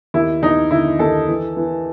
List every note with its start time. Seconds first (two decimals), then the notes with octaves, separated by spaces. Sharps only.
0.14 D#2 E4
0.43 D#2 D#4
0.71 D3 E4
0.99 D#2 A4
1.28 E3
1.57 E3